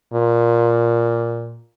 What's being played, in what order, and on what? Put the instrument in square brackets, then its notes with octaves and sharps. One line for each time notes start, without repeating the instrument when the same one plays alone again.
[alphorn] A#2